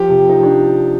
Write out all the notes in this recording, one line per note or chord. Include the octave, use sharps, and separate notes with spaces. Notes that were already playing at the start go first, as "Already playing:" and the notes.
Already playing: F3 G4
C3
F3 D#4
D4